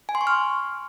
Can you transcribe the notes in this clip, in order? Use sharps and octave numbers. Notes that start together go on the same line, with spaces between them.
G#5
C6
C#6
F6